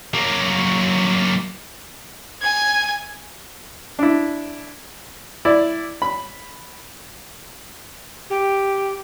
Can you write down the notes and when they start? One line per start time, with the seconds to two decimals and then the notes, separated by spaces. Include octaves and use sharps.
0.14 F#3 A#3
2.42 G#5 G#6
3.99 D4 E4
5.45 E4 D5
6.02 B5
8.29 G4